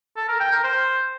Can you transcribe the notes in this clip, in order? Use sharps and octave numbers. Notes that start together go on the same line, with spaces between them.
A4
A#4
G5
A#4
C5